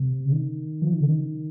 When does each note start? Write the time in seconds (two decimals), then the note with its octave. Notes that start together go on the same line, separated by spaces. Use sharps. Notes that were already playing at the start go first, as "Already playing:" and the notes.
Already playing: C3
0.25 C#3
0.32 D#3
0.82 F3
0.91 D#3
1.00 C#3
1.08 D#3